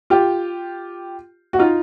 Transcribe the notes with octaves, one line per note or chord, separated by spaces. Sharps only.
F4 G4
F#4
D#4 F4